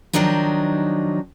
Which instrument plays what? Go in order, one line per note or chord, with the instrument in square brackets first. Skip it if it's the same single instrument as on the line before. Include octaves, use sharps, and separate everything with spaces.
[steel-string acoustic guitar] D#3 F3 F#3 D4 D#4